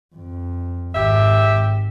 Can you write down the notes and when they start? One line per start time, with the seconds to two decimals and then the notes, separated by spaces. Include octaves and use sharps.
0.15 F2
0.94 G#1 G#2 G4 E5